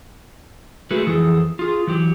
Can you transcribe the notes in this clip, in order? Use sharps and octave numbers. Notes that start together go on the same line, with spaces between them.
G#3 A3 F#4 G#4 B4
F2 E3 G#4 A4
F4 G#4
E3 F#3 G4